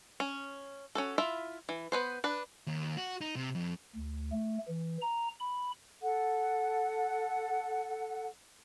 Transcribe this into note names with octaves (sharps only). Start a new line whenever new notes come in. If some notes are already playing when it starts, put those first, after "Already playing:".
C#4
C#4 F#4 A4
E4 F4 E5
E3
B3 B4 C5
D4 B4
D#2
F#4
D#4
C3
F2
D2
A3
E3
A#5
B5
A4 F#5